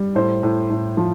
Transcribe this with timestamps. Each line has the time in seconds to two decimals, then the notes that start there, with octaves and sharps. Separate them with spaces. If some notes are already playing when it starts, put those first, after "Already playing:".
Already playing: G3
0.15 A2 C5
0.43 A2
0.70 A2
0.97 F3